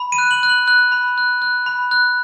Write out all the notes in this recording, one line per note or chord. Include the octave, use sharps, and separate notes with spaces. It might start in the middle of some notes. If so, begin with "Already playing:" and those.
Already playing: B5
D#7
F#6
F#7
F#6
F#7
F#6
B5
F#6
F#6
B5
F#6